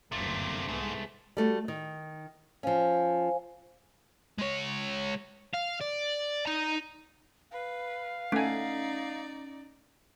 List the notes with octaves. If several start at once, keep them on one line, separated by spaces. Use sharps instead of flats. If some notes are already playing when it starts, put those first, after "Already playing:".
F#1 D2 G2 C3 A3 A#3 C4
C2 G#2 G#3 B3
G3 A3 F#4
D#3
F3 C#4 C5 F5 G#5
G#3 C#5
F5
D5
D#4 A#5
B4 F5
A3 C#4 D#4 D5 G#5